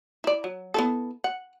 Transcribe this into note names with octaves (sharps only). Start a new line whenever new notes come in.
E4 D5
F#3
B3 E4 A4
F#5